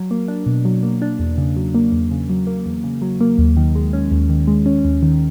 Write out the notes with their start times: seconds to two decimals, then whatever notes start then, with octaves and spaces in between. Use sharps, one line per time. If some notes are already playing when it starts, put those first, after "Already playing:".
Already playing: F#3
0.11 A#3
0.28 D4
0.46 B2
0.65 F#3
0.83 A#3
1.02 D4
1.19 E2
1.38 C#3
1.56 F#3
1.75 A#3
1.92 E2
2.11 C#3
2.30 F#3
2.47 A#3
2.66 E2
2.84 C#3
3.02 F#3
3.21 A#3
3.38 D#2
3.57 D#3
3.75 G#3
3.93 C#4
4.11 D#2
4.30 D#3
4.47 G#3
4.66 C#4
4.85 D#2
5.03 D#3